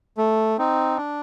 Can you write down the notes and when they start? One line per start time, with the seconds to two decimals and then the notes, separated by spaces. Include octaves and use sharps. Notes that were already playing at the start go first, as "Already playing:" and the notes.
0.18 A3
0.58 C4 D#4
0.97 D4